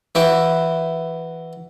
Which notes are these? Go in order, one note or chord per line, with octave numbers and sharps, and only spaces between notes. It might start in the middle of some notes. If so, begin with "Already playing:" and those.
E3 E4 F#4 G5